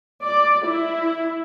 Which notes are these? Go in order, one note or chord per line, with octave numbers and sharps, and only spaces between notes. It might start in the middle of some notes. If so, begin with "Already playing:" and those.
D5
E4